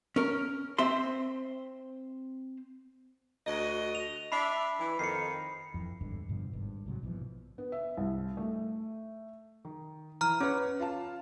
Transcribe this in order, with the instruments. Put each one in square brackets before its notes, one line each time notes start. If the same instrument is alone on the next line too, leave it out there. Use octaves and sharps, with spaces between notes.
[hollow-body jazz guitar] C#4 A#4
C4 C5 E5 C6
[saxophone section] D2 F#4 D#5
[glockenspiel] F7
[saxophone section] D4 D5 E5 [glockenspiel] B5 C7
[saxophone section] E3
[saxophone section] F2 D#3 [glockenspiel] C7 C#7
[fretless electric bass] F2 E3
G#1 E2 G2 D3
G2 B2 D3 F3
G#1 G2
G#2 C3 F#3
A#1 B2 E3 F3
[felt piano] B3
E5
C2
A3
D#3
[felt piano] E3 [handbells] A#5 F6
[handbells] C#4 [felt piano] B4 C#5
[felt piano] F4 F5 A5